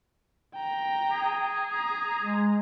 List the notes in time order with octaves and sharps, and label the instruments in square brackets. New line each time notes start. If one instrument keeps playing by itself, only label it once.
[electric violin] G5 A#5
[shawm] G#4
[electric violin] A#5
[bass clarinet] G#3